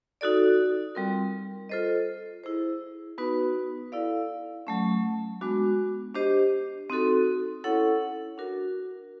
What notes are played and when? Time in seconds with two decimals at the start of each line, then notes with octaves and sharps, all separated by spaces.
0.21 D#4 F#4 A4 D5
0.95 G3 C4 F4 A#4
1.69 F4 A4 C5 D#5
2.44 E4 G#4 C5
3.18 B3 D#4 F#4 B4
3.92 E4 A4 D5 F5
4.67 F#3 A3 C#4
5.41 G#3 B3 D4 F#4
6.15 D4 G4 C5 D#5
6.89 C4 D#4 F#4 A4
7.64 C#4 E4 A4 C#5 F#5
8.38 D4 F#4 A#4